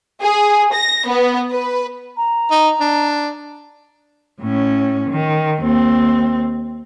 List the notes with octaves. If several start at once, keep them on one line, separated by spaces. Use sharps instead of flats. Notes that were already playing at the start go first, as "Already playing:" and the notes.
G#4
A#6
B3
B4
A#5
D#4
D4
A2 C#4
D#3
D#2 C4